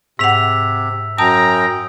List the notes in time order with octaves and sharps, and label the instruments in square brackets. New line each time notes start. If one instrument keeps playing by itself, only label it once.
[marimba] G#2 F#5 [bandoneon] C3 [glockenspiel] E6 B6 F7
[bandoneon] F#2 G5 [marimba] A5 [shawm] A#5 [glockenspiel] D#6